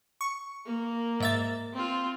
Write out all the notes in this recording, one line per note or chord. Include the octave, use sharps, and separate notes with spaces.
C#6
A#3
G#2 E5 A6
C4 F4